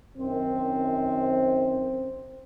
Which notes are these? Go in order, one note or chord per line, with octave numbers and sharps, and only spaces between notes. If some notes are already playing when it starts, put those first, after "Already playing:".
F#2 D#3 C4